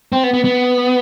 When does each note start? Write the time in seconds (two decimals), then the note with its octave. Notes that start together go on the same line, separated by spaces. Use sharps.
0.12 C4
0.23 B3
0.34 B3
0.44 B3